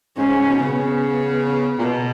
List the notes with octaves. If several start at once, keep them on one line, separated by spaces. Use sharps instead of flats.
G#2 C#4
G#2
G#2
B2
C#3 B3
A#2
B2